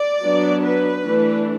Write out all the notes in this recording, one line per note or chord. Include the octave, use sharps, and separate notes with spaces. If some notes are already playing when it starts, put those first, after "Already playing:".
Already playing: D5
F#3 B3 D4
B4
E3 A3 D4